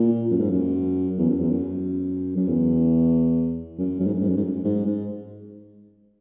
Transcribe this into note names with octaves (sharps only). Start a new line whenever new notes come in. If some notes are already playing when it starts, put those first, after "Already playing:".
Already playing: A#2
F#2
G#2
F#2
E2
F#2
E2
F#2
F#2
E2
F#2
F#2
G#2
F#2
G#2
F#2
G#2
F#2
G#2
G#2